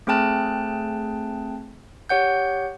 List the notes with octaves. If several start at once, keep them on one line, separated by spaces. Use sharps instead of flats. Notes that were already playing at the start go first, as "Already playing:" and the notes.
A3 C4 G#4 G5 A5 F#6
G4 C#5 F#5 G6